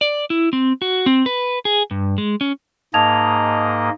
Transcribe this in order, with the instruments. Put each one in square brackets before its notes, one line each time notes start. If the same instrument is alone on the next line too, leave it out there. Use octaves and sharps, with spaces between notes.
[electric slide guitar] D5
E4
C4
F#4
C4
B4
G#4
G2
G#3
C#4
[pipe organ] G#2 A#3 D#5 [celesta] A5 G#6 F7